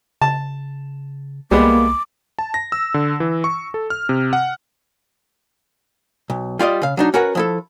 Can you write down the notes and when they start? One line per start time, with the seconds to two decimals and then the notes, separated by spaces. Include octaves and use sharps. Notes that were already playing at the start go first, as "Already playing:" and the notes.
0.22 C#3 A5
1.51 C2 G3 G#3 A#3 B3 D6
2.39 A5
2.54 A#6
2.72 E6
2.94 D3
3.20 E3
3.44 C#6
3.74 A4
3.90 F6
4.09 C3
4.33 F#5
6.30 B1
6.59 G3 F4 D5 D#5
6.82 C#3 F5
6.97 F#3 D4 D#4
7.14 C#4 F#4 A#4 B4 F#5
7.35 F3 E4 A4